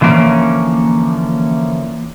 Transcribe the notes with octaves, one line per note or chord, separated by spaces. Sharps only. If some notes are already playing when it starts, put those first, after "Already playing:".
D3 E3 F3 A#3 C#4